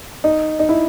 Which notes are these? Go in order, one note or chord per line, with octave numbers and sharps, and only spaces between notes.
D#4
D#4
E4